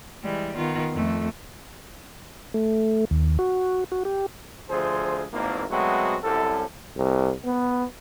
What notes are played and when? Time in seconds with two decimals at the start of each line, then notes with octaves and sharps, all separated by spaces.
0.23 E3 G3 G#3
0.56 D#3 B3 F4
0.93 F2 A3
2.54 A3
3.11 D#2
3.39 F#4
3.92 F#4
4.05 G4
4.69 D2 F3 G#4 C5
5.32 G#1 E2 A#3
5.70 F#3 G#3 A3 B3 C4 F#4
6.24 C2 F#2 A4
6.96 C2
7.45 B3